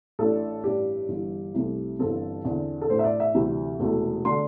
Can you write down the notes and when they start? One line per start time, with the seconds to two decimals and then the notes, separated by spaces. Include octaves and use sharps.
0.19 A1 A2 A3 D4 A4
0.64 A1 G2 G3 D4 G4
1.09 G1 G2 E3
1.55 C2 C3 A3 C4
1.99 G1 G2 E3 G3 C4 A4
2.44 E2 D3 C4
2.81 A4
2.89 A1 A2 A3 D4 C5
2.99 E5
3.04 D5
3.20 E5
3.34 D2 C3 E3 G3
3.80 E1 E2 C3 A3
4.25 D3 A3 D4 C6